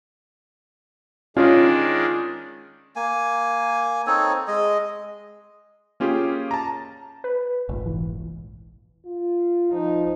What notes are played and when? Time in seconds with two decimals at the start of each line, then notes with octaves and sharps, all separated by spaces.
1.37 D#3 G#3 C#4 D4 F4
2.96 A#3 G#5
4.07 C4 D#4 A4 C#5
4.48 G#3 D#5
6.00 A#3 C#4 F4 G4 G#4
6.51 A5 A#5
7.24 B4
7.69 F1 A#1 G#2
7.86 E3
9.06 F4
9.72 F3 D#4